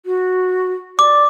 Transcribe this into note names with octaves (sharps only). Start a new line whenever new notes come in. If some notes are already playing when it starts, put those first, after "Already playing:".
F#4
D5 D6